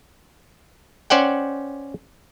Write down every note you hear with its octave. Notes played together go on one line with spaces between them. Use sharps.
C#4 C5 D5 F#5 G5